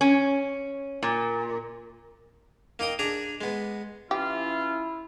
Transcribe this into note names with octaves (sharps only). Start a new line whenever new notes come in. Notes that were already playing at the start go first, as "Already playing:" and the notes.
C#4
A#2
A#3 D#4 G5 D#6
D4 G#4 A#5
G#3 B3
E3 C#4 E4 F4 G4